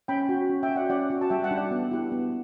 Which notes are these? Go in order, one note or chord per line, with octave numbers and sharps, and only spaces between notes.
C#4 G5 B5
F#4
C#4
E5 G5
F#4
D5 F#5
C#4 D5 F#5
F#4
A5
G3 E5 G5
F#5 A5
D4 F#4
D5 F#5
B3
E4 G4
B3